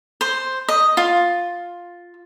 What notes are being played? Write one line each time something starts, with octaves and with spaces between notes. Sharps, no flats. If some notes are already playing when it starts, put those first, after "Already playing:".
C5
D#5
F4